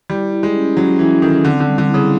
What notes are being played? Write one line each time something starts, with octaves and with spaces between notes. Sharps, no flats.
G3 E4
E4
G#3
C#4
F#3 C#4
E3 C#4
D#3 A4
D3 C4
D3
G3
D3
E4
C#3